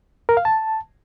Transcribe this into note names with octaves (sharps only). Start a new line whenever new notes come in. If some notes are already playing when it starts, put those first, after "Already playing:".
A#4
F5
A5